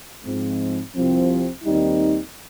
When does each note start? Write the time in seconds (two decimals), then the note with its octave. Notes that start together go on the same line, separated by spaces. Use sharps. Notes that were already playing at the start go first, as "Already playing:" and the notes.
0.24 G#2 F3 G#3 C4
0.95 C2 C3 F3 C4
1.64 D#2 D#3 G3 C4 D#4